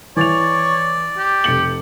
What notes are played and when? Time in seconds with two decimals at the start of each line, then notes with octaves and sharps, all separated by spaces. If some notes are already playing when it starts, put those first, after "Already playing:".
0.17 E3 C#5 D5 A6 F7
1.18 G4
1.44 F1 C#7 F#7